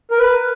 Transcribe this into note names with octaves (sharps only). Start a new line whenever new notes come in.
A#4
B4